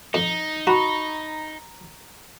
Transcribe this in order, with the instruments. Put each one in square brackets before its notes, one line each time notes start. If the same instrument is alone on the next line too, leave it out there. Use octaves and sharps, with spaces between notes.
[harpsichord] F2 [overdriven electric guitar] D#4
[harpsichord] F#4 [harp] A#5 B5 C#6